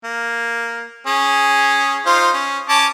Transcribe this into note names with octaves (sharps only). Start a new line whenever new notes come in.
A#3
C#4 G#4
D#4 F4 C5
C#4
C#4 A5 D6